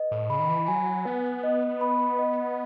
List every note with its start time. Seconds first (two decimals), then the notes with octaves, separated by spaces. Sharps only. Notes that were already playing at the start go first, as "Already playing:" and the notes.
Already playing: B4 D#5
0.11 A2
0.30 C#3 B5
0.39 D#3
0.49 E3
0.68 F#3 G#5
1.05 B3 B4
1.43 D#5
1.81 B5
2.19 D#5